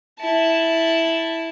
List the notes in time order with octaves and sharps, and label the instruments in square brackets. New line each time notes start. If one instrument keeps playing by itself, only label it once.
[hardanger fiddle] E4 A5